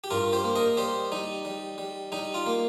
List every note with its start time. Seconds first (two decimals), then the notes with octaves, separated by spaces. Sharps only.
0.04 G4
0.11 G2 F4 A#4
0.33 G4 C5
0.44 A#3
0.56 A#4 D#5
0.77 G3 G4 C5
1.12 G3 D#4
1.45 G3
1.78 G3
2.12 G3 D#4
2.34 F4
2.46 A#3